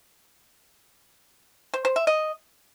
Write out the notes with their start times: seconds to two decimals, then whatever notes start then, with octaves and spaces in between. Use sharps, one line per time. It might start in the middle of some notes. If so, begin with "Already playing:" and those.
1.74 C5
1.85 C5
1.96 E5
2.07 D#5